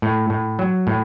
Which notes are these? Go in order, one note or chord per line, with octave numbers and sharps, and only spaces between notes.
A2
A2
F#3
A2